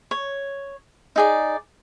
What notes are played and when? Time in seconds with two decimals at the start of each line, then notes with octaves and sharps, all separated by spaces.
0.11 C#5
1.16 D#4 G#4 D5